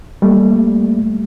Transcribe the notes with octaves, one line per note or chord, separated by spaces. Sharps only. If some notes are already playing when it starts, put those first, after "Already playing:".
G3 A3 A#3